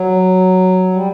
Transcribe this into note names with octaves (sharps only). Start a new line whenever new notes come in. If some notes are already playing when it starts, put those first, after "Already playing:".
Already playing: F#3
G3